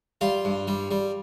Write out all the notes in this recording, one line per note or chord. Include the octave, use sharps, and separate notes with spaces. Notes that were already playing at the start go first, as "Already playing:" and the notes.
G3 F4
G2
G3
G3